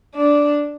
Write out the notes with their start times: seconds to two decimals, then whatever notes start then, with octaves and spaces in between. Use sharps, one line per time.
0.15 D4